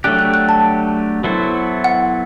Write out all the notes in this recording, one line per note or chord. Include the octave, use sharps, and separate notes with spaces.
F#3 A3 D4 G4 F#6
F#6
F#6
A5
F#3 B3 E4 A4 C5
F#5